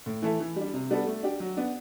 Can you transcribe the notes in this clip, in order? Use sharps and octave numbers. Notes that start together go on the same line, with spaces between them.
A2
E3 A3 E4 A4
E3
G3 D4
C3
G3 B3 D4 A4
A3
D4 G4
F#3
B3 D4